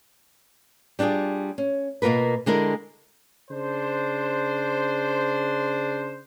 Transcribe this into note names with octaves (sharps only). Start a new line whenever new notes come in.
G3 D4 D#4 F4 G#4
C#4
B2 A#3 F4 A#4 B4
D3 G#3 E4 A#4
C#3 D4 C5